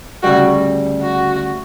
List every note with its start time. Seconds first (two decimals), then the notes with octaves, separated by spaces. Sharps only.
0.23 D2 C#3 G3 F#4
1.02 F#4